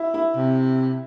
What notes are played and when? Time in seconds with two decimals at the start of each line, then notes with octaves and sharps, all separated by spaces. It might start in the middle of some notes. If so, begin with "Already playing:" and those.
Already playing: E4
0.14 E4
0.36 C3